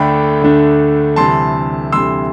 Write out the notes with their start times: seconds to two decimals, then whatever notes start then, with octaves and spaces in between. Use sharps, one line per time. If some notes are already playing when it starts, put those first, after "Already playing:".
Already playing: D2 D3 A3 D4 G5 B5
0.41 D2 D3 A3 D4
1.16 D2 C3 E3 G3 A5 C6
1.92 D2 C3 E3 G3 C6 E6